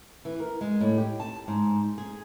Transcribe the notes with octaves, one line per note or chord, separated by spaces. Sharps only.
E3
A#4
G#3
A2
G4
A5
G#2
G#4